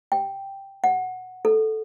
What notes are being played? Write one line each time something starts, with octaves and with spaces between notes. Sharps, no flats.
G5
F#5
A4